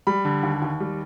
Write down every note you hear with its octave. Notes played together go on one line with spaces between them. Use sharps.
G3 B5
D3
D#2
D#2
G3